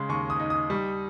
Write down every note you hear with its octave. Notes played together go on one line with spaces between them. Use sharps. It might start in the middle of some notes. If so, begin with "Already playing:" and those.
Already playing: C#3 G#3 C6
D#2 C#6
D#6
D#4
D#6
G3